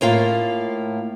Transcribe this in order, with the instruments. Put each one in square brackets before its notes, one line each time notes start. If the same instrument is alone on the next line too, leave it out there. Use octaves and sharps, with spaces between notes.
[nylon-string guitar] A2 A#3 F4 F5